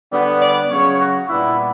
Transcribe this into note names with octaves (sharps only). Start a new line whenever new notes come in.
D3 G3 B3
D5
C#3 F#3 C#4 C#5
F#4
A#2 G3 B3 D4 E4